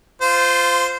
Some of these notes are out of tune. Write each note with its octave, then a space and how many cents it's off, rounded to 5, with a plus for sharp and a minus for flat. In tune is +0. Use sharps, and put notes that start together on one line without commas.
F4 +0 C5 -15